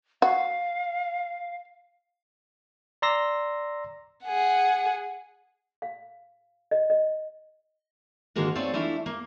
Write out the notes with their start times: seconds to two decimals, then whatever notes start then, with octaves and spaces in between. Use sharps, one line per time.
0.22 F#4 F5
3.02 D5 A#5 C6 E6 A#6
4.25 G#4 F#5
5.82 F5
6.71 D#5
6.90 D#5
8.36 G#2 D3 D#3 G#3 A#3 F#4
8.55 A3 C4 C#4 C#5 D5 F5
8.74 E3 A3 D4 E4 F4
9.06 A#3